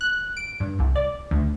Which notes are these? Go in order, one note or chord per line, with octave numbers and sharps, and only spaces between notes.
F#6
D7
G2
C2
D5
D2